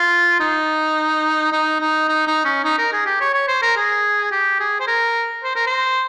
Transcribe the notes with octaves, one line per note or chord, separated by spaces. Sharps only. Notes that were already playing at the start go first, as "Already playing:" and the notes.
Already playing: F4
D#4
D#4
D#4
D#4
D#4
C#4
D#4
A#4
G#4
G4
C#5
C#5
C5
A#4
G#4
G4
G#4
C5
A#4
C5
A#4
C5